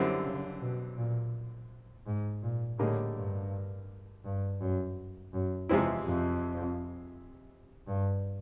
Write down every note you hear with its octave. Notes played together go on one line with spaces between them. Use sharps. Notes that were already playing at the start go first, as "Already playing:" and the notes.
Already playing: F#2 D3 G3 C4 E4
C#3
B2
A#2
G#2
A#2
A2 D3 G3 A#3 D#4 G#4
G2
G2
F#2
F#2
E2 C3 F3 G#3 C4 E4
F2
G2